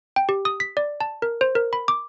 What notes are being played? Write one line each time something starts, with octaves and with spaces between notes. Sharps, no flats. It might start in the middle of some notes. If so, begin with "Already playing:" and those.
G5
G4
D#6
B6
D5
A5
A#4
C5
A#4
B5
D6